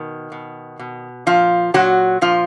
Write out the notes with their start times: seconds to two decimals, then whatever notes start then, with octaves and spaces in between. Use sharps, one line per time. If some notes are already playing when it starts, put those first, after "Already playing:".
Already playing: B2 D#3
0.32 B2
0.79 B2
1.26 A#2 F3 F4
1.74 A#2 F#3 F#4
2.21 A#2 F3 F4